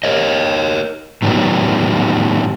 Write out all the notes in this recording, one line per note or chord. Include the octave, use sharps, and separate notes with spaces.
A#4 C#5 D#5
A2 D#3 F#3 G3 B3